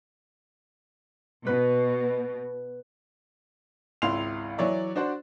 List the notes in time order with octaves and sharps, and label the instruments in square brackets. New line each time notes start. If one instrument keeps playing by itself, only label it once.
[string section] B2 [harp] B4
[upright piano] G#1 C#2 E4 F5 C6 F7
E3 F#3 C#5 D5 E5
D4 F#4 C5 D5